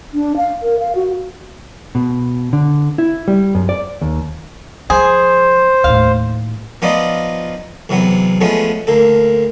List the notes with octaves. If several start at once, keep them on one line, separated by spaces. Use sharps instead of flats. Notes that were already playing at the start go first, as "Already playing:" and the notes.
D4
F5
A#4
F5
F#4
B2
D3
E4
G3
F#2
D5
D#2
F3 G#3 G#4 C5
D#2 A2 F5
F3 B3 D#4 F4 D5 D#5
E2 C3 F#3 B3
F3 G#3 A3 B3 C#4
D2 A#3 A4